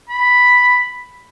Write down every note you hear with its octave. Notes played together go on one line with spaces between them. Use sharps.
B5